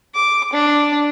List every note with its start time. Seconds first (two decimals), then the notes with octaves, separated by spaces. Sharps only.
0.14 D6
0.53 D4